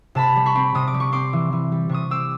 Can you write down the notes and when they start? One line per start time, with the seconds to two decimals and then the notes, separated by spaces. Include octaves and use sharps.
0.15 C3 A5 B5
0.36 G3
0.46 B5 C#6
0.55 C4
0.75 C3 D#6
0.88 D6
0.94 G3
1.00 C#6
1.12 C4 C6 D6
1.33 E3
1.53 E3
1.72 G3
1.89 C3 C#6 D#6
2.11 C4 D6 E6